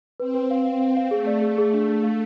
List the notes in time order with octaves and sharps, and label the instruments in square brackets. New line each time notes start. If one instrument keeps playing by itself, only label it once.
[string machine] C4 [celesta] B4
[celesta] B4
F5
[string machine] C4 [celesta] F5
[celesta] F5
F5
[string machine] A3 [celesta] G#4
[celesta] D5
G#4
[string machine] A3 [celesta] G#4
[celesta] D4
D4
F5